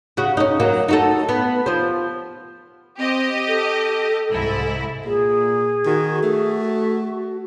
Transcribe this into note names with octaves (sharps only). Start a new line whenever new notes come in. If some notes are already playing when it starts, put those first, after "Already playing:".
C#3 F#4
C#4 D#4
F#3 A#3
D#4 F#4 A4
B3
F3 C5
C4 G4 D#5
A4
C2 G#2 E4
A#2 G#4
D#3 F#4
A3